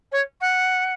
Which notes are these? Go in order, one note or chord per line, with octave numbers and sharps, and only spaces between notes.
C#5
F#5